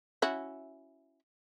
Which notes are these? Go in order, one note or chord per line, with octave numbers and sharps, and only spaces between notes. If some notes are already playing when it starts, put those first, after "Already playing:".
C#4 E4 F#4